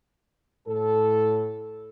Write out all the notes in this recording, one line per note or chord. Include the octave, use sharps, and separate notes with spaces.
A2 A4